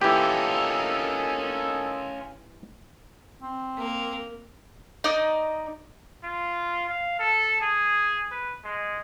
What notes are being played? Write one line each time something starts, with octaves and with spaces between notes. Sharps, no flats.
E3 A#3 C#4 D#4 F4 G4 A4
C4
A#3
D#4 D5 D#5
F4
F5
A4
G#4
B4
G#3